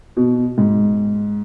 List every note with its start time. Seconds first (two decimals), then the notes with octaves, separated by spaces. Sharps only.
0.17 B2
0.58 G#2